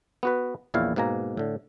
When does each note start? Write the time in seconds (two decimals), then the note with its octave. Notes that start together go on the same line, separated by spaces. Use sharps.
0.23 B3 F#4 B4
0.74 A#1 E2 A#2 E4 C#5 F5
0.96 G#2 B2 A#3 G#5 A#5
1.37 A2 D3